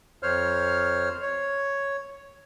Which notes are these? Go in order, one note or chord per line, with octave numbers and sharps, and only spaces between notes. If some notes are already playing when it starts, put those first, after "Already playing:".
F2 C5 C#5 F6
C#5